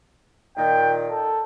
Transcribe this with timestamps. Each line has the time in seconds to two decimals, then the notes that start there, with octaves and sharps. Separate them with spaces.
0.57 A#2 D#3 G5
1.10 A4